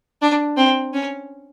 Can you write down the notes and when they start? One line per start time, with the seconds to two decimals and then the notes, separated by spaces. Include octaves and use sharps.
0.22 D4
0.57 C4
0.93 C#4